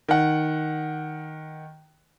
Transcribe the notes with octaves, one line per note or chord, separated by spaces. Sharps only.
D#3 F#5